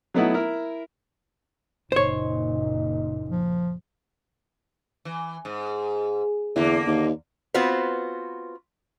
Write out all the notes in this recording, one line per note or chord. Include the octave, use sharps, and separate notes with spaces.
F#3 A3 B3 D#4 E4 F#5
E4 A#4
F#1 A#2 D#4 C5 C#5
F3
E3
G#2
E2 D3 A#3
D#2
B3 C4 F4 F#4 B4 C5